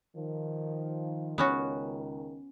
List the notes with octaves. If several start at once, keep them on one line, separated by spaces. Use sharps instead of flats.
D#3 F3
C#2 D#3 B3 C#4 F#4